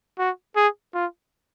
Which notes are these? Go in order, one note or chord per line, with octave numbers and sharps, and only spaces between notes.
F#4
G#4
F4